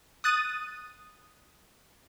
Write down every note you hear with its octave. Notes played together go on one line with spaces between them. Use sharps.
D#6 F#6 A6 D#7